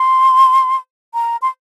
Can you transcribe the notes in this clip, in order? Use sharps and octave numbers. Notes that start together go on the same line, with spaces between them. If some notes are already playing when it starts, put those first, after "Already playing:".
Already playing: C6
A#5
C6